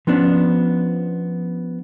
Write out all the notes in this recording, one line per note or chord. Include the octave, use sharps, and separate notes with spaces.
F3 B3 C#4 D4